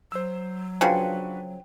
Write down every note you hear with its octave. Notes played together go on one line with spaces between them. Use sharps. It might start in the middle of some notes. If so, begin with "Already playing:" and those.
F#3 C5 E6
C#3 F3 D4 F#4 B4 F#5 G5